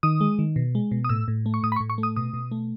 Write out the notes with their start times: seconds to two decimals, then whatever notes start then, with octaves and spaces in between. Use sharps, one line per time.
0.03 D#3 D#6
0.21 G#3
0.39 D#3
0.56 B2
0.75 G#3
0.91 B2
1.04 D#6
1.09 A2 E6
1.28 A2
1.46 A3
1.54 C#6
1.63 A2 D#6
1.72 B5
1.76 C#6
1.80 A2
1.90 C#6
1.98 A3
2.03 D#6
2.16 B2 D#6
2.34 B2
2.51 A3